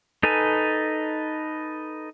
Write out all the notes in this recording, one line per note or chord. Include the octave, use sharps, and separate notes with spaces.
D#4 A4 B4 G#5